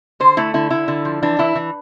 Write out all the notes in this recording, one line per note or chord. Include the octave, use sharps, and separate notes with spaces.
D3 C5
A3 E4
D3 E4
D3 E4
D3
F3
E3 D4
E3 E4
E3